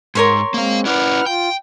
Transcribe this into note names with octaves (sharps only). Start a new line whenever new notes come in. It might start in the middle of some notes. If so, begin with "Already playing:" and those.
G#2 A#4 C#5 C6
G#3 A#3 C4 F5
C#4 E4 B4 D5 F#5 F6
F4 G5